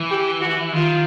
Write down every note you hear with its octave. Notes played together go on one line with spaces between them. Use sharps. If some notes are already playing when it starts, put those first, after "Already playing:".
Already playing: E3
G4
F#4
D#3 F4